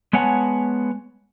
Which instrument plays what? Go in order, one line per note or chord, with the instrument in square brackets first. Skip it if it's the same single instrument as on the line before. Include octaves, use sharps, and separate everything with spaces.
[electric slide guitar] G#3 B3 C#5 F#5 G#5 A5